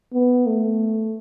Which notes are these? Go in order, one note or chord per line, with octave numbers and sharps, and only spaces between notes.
B3
A3